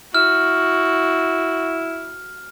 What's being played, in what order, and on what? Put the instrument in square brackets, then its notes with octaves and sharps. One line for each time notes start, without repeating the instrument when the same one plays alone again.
[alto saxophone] E4 [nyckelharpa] F#4 [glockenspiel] F6